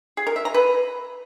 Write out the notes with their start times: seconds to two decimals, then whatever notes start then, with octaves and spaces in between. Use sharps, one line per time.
0.17 G#4
0.27 A#4
0.36 E5
0.45 A#5
0.54 B4